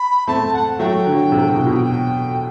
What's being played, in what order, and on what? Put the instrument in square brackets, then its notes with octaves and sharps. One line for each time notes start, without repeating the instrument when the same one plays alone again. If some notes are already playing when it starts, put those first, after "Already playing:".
Already playing: [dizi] B5
[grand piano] A3 C4 [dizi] A5
[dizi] F#5
F#5
[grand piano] F#3 A3 [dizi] G5
[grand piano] D3 F#3
C3
B2
B2
[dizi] G5